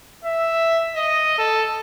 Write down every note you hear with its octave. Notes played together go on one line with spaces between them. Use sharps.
E5
D#5
A4